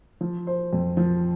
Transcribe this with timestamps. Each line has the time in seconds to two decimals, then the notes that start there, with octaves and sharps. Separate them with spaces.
0.21 F3
0.47 C5
0.73 F2
0.97 F3